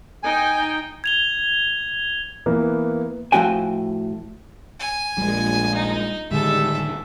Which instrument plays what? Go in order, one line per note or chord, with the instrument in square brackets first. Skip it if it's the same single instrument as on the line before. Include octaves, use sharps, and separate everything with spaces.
[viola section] D#4 G5 [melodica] G#5
[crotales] G#6 F7 G7
[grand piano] E3 A#3 B3
[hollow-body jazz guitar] A2 F3 C4 F#4 G5 G#5
[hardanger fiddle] G#5
[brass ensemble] A#1 [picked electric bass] G3 G#3
[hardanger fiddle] D#4
[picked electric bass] A2 D3 D#3 [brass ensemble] G3 G#3 [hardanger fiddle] A4 E5